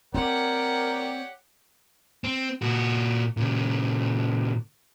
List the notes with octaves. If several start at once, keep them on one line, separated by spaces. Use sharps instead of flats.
C4 G4 A#4 C#5 D5 F#5 G5
C4
A#2 F#4
A#2 C#3